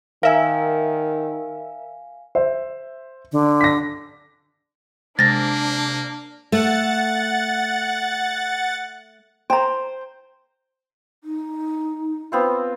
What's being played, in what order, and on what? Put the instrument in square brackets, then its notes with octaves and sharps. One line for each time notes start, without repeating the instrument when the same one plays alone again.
[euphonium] D#3 [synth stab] A#4 E5 [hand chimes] F5 G#5
[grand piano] C5 E5
[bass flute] D3
[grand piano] A#6 B6
[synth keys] C3 G#3 [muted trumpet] A#3 [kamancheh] D4 [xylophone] A6 A#6
[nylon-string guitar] A3 [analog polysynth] F#5 A6
[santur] C5 [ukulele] G5 A#5
[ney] D#4
[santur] B3 C4 F4